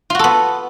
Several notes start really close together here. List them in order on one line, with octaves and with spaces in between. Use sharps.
F4 F#4 A4 B3